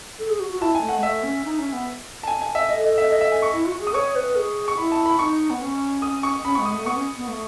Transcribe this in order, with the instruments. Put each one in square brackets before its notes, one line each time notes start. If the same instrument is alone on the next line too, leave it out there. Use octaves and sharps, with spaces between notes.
[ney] A4
G#4
F#4
F#4
[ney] E4 [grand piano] A5
[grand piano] G#5
[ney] A3
[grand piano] F#5
[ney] G#3
[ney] A3 [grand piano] E5
[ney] C#4
D#4
C#4
B3
[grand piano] A5
G#5
G#5
E5
[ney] A4 [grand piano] D#5
[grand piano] D#5
E5
D#5
E5
G#5
C#6
[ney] E4
F#4
G#4
[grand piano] D#6
[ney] C#5 [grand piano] C#6
[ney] B4
G#4
[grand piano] C#6
[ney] E4 [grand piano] B5
[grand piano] A5
B5
[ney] D#4 [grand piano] C#6
[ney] B3
C#4
[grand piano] D#6
C#6
[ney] C#4 [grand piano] B5
[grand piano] C#6
[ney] G#3
[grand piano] D#6
[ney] A3
[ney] B3 [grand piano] C#6
[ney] C#4
B3
A3